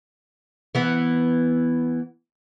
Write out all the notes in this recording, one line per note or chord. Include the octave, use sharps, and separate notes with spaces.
E3 B3